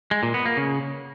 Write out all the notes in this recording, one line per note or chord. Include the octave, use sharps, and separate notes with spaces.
G#3
A#2
B3
A#3
C#3